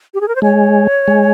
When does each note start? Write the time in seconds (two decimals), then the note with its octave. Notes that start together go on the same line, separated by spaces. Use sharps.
0.14 G4
0.21 G#4
0.28 A#4
0.36 C5
0.42 G#3 C#5
1.08 G#3